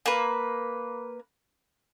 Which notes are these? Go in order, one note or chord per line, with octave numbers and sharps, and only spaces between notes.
A#3 B4